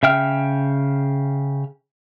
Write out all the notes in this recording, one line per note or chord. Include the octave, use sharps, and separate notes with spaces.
C#3 E5 G5 F6